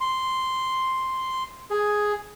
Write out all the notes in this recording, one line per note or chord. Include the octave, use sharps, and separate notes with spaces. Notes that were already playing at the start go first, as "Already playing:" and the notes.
C6
G#4